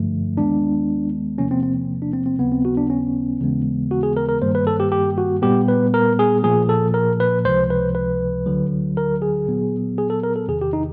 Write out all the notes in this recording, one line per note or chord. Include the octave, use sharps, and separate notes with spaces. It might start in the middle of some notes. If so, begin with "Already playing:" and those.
Already playing: G2 D3 F3 A3
D#2 D#3 G#3 B3 D4
E2 C3 F3 A#3 C#4
C4
C4
D4
C4
C4
D#2 C#3 F#3 B3
C4
F#4
D4
C#4
D#2 C#3 E3 G#3 B3
F#4
G#4
A#4
A#4
G2 D#3 G3 A#3 C5
B4
A4
G4
G4
F#4
A#2 G3 B3 G4
B4
A#4
G#4
A#2 F3 A#3 G#4
A4
A#4
B4
C#2 C3 F3 C5
B4
B4
D2 D3 F#3
A#4
G#4
A#2 F#3 B3
G#4
A4
A#4
A4
E2 C3 D#3 G#4
G4
D#4